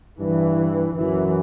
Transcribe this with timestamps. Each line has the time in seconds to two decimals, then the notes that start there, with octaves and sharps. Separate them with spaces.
0.20 G2 E3
0.95 F#2 E3